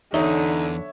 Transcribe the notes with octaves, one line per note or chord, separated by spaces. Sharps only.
E2 D3 D#4 C#5 E5